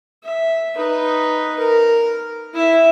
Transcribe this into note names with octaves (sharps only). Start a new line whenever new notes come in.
E5
D#4 B4
A#4
E4 E5